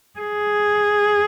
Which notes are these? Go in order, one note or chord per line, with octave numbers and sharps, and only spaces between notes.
G#4